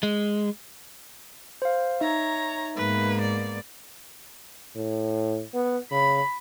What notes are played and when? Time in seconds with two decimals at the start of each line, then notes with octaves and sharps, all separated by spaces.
0.03 G#3
1.62 C5 F5
2.01 D#4 C#5 E5 A#5
2.77 G#2 A#3 B3 B4
3.21 D5
4.76 A2
5.54 B3
5.91 C#3 B5